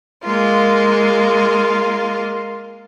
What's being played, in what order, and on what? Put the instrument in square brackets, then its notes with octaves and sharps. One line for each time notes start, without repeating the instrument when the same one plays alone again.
[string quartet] G#3 A#3 F4